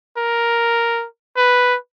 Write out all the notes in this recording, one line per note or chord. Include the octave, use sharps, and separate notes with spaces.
A#4
B4